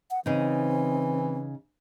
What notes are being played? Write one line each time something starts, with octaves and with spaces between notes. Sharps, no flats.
F#5
C#3 E3 C4 D#4